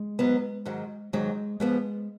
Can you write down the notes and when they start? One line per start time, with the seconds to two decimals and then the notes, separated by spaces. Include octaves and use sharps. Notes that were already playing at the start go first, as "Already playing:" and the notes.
Already playing: G#3
0.19 G#2 F#3 B3
0.65 G#2 D#3 F#3
1.13 G#2 D#3 F#3 G#3
1.60 G#2 F3 G#3 B3